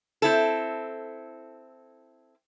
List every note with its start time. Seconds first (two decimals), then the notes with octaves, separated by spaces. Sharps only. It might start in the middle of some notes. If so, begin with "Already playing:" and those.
0.22 C4 E4 A4